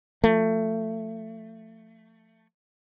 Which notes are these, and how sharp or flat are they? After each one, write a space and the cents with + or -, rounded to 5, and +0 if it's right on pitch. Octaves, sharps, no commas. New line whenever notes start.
F3 +0 A3 +20